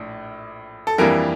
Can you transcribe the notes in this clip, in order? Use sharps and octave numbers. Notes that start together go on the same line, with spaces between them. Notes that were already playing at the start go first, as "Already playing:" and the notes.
Already playing: A#1 A2 D4
A4
F2 E3 G3 A#3 D4 A#4